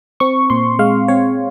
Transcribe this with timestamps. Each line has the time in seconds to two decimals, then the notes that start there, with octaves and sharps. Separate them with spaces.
0.20 C4 C#6
0.50 A#2 C6
0.79 G#3 F5
1.08 C4 C#5